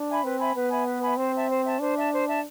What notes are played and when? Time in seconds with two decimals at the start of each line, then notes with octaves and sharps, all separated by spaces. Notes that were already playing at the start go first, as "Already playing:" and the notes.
Already playing: D4
0.08 E5 G#5 B5
0.23 C4 B4
0.39 E5 G#5 B5
0.55 B3 B4
0.71 E5 G#5 B5
0.86 B4
1.02 E5 G#5 B5
1.17 C4 C5
1.33 E5 A5
1.49 C5
1.64 E5 A5
1.80 D4 C5
1.96 E5 A5
2.12 C5
2.27 E5 A5